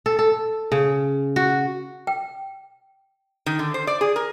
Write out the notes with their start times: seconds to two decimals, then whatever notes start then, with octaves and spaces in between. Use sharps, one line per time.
0.06 A4
0.19 A4
0.72 C#3
1.36 F#4
2.07 G5
3.46 D#3
3.59 D3
3.74 C5
3.87 D5
4.01 G#4
4.16 A#4